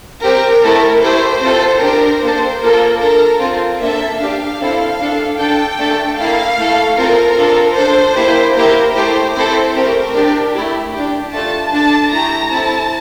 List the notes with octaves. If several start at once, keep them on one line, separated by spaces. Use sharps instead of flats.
C4 G4 A#4
A3 E4 A4
A3 E4 G4 C5
C4 F4 A4
D4 G4 A#4
A#3 D4 A4 C5
A#3 F4 A4 A#4
D4 A4 A#4
C4 F4 A4
A#3 D4 A4 E5
D4 G4 F5
C4 E4 A4
D4 A4
D4 A4 G5
A3 D4 A4
A#3 E4 A4 F5
A3 E4 A4
C4 F4 A4 A#4
D4 F4 A4
D4 A4 C5
A#3 E4 G4
A#3 E4 G4 A#4
A3 E4 G4 C5
C4 E4 A4 C5
A3 C4 G4 A#4
D4 G4
A3 E4 G4
D4 G4
A3 D4 F4 A4 A5
D4 A4 A5
A3 E4 G4 A#5
C4 E4 A4 A5